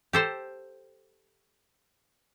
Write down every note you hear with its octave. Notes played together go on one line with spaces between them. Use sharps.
G4 A4 C5